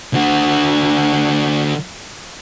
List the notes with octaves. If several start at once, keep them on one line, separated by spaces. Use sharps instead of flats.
D3 F#4